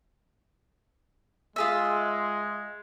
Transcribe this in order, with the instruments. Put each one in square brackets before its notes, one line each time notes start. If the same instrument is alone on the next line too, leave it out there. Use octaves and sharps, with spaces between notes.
[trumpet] G#3 [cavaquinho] F4 G#4 E5